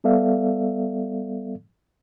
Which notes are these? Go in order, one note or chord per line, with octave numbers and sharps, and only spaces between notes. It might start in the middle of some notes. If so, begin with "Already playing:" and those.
G3 B3 A4 D5 E5 F5